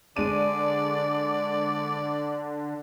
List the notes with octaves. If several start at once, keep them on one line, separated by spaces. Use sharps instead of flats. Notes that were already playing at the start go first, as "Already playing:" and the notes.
D3 G#3 D4 D5 D#7